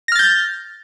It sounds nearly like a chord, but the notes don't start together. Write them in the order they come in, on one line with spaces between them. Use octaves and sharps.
A#6 F6 A6 G6